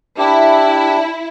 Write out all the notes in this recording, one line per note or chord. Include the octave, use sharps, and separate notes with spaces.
D4 E4 G4